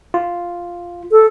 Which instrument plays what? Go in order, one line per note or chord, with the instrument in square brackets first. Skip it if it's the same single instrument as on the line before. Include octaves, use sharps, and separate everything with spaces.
[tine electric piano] F4
[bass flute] A4